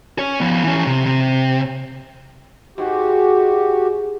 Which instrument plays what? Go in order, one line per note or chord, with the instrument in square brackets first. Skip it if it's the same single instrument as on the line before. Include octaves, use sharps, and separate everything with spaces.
[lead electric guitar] C#4 C#5
F3 B3
E3 C#4
C3
C3
[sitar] G#2 [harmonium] F#4 G4